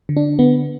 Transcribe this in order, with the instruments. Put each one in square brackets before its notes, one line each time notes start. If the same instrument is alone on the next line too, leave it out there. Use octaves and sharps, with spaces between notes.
[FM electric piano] D3
D4
D3 B3